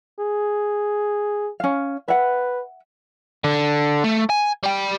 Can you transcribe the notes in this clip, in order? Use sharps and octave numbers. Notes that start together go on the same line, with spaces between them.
G#4
C#4 F5
B4 E5 F#5
D3
A3
G#5
G3 G5